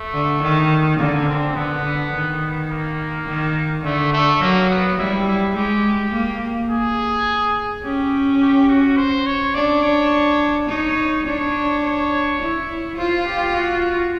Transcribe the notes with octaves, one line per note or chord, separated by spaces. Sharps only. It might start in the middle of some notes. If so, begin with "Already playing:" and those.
Already playing: A3
D3
D#3
D3 A#3
C4
D3 B3
D3
D#3
A#3
D#3
D3 A3
A3
F#3 A#3
B3
G3 E4
E4
G#3 G4
A#3
G#4
C#4 G4
G4
F#4
C5
C#5
D4 D5
C#5
D#4 C#5
D4 C#5
C#5
E4
F4 C5
G4
F#4